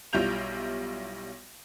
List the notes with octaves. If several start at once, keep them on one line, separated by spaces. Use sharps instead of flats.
B1 G3 E4 F4 G6 F7